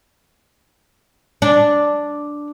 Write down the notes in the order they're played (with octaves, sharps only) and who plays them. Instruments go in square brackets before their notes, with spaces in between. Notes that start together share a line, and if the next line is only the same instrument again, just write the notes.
[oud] D4